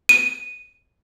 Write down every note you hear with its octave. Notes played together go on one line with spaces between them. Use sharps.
D#7